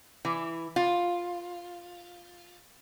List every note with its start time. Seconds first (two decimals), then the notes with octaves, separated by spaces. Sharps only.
0.25 E3
0.76 F4